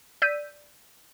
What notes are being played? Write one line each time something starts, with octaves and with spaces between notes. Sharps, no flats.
D5 E6 G6 B6 D#7